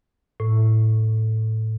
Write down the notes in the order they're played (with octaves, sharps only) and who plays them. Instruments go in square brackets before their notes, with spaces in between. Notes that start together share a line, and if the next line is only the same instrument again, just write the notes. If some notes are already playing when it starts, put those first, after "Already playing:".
[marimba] A2